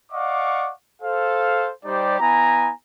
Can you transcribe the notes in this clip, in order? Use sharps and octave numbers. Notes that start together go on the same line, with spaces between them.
D5 D#5 F5 F#5 C#6 D6
A4 C5 F5
G3 D#4 G4 C5 D5
B3 E4 G#5 A#5